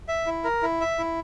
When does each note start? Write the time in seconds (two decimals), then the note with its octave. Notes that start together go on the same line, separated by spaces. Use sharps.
0.08 E5
0.26 E4
0.44 A#4
0.62 E4
0.81 E5
0.99 E4